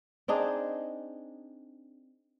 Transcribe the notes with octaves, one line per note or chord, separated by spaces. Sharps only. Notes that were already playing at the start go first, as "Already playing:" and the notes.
C4 D4 D#4 G#4